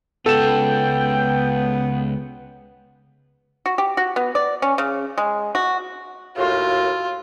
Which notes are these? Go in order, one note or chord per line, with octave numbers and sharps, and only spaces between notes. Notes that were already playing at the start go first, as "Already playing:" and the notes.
C#2 B3 F4 A4 G5 E7
F#4
G4
F#4
B3
D5
C#4
C#3
G#3
F#4
D#2 A2 F4 F#4